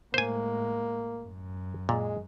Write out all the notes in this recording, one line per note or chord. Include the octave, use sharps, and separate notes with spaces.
A2 G#3 A#3 C5 G#5
F#2
A#2 G#3